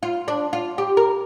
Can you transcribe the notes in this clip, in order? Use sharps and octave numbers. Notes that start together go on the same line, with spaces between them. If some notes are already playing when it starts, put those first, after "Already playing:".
F4
D4
F4
G4
A#4